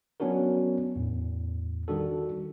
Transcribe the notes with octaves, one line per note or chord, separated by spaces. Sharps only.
F#3 B3 C#4 D4 F#4 A#4
E2 A2
D#3 G3 D4 F#4 A4